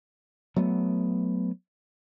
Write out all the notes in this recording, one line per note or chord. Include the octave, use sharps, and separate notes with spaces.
F#3 A3 B3